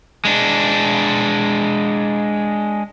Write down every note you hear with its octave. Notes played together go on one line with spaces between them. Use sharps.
G#3 D4